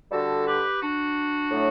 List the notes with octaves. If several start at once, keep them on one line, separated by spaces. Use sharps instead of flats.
D3 G3 F#4 A4
G4 B4
D4 F#4
A2 F#3 A3